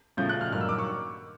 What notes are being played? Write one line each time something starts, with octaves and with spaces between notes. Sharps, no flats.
C#3 F3 A3 G6
F#6
F6
G2 D#3 F#3 A#3 F6
E6
D6
C#6